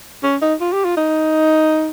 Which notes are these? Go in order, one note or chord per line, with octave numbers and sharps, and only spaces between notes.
C#4
D#4
F4
G4
F4
D#4